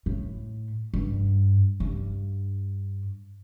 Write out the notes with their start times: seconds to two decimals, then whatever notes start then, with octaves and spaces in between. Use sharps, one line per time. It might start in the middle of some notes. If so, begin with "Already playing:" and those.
0.06 A2
0.94 G2
1.80 G2